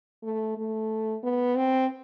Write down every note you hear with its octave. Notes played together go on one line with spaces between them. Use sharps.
A3
A3
B3
C4